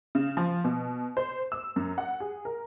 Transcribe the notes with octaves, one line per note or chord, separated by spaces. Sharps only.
C#3
F3
B2
C5
E6
F#2
F#5
G#4
A#4